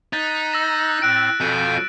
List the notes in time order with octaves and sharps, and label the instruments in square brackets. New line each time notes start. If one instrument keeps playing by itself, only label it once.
[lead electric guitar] D#4 [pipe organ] F#6 G6 [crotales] A6 B6
[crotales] E6 A#6 E7
[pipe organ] A2 C4 A6 [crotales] F#6 D7
[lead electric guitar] F2 [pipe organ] B2 G#5 G6